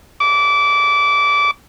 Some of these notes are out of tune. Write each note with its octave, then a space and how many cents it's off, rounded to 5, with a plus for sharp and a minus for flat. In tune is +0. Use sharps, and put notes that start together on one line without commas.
D6 -20